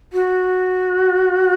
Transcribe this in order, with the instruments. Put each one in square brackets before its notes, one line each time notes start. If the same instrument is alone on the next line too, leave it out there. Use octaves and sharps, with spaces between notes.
[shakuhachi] F#4